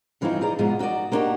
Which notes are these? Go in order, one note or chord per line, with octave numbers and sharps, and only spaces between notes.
G2 E3 F3 C4 D#4 E4
D#4 G#4 D5 A#5
G#2 B2 F3 B3 G#4
D#4 F#4 B4 D5 D#5
A#3 B3 D4 D#4 F#4 G4